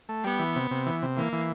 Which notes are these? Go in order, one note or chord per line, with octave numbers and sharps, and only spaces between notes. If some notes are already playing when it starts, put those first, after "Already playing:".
A3
G3 B3
E3
C3
C3
E3
C3
E3 A#3
E3